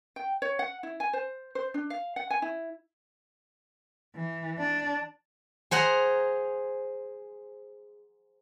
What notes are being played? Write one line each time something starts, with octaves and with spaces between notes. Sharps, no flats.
G5
C#5
F#5
E4
G#5
C5
C5
D4
F5
F#5
G#5
E4
E3
D4
G#4 C5 F#5 A#5